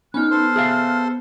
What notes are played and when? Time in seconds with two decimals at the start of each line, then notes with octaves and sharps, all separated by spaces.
0.14 B3 C#4 D#4 F6 F#6
0.31 A4 C5 C6
0.56 G#4 E5 F5